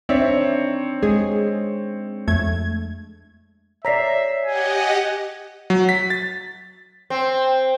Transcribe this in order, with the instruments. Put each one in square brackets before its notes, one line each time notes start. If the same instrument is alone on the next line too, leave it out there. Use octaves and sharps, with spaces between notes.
[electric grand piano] C4 C#5 [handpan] D4 D#4 [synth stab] D5 E5
[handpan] G#3 [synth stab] G#4
[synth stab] F2 A3 G#6
[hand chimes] C#5 B6 C7 [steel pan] D5 A#5 [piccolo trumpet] E5
[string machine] G4 D#5 F#5 [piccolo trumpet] G#5
[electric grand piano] F#3
B6
A6
[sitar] C4